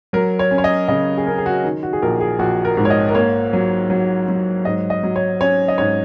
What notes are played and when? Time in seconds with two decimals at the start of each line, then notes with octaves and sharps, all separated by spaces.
0.13 F#3 A#4
0.39 C#5
0.51 C#4
0.58 C#5
0.64 D#5
0.88 C#3 D#5
1.18 G#4
1.26 C#4 A#4
1.38 G#4
1.46 F#4
1.64 D#3
1.83 F#4
1.93 G#4
2.02 A#1 A#4
2.20 G#4
2.39 A#1 F#4
2.65 A#4
2.77 G#2
2.85 C#5
2.90 D#5
3.08 A#4
3.15 A#3 C#5
3.53 F#3
3.90 F#3
4.28 F#3
4.65 G#2 D#5
4.90 D#5
5.03 F#3
5.16 C#5
5.41 C#4 C#5
5.68 D#5
5.78 G#2 C#5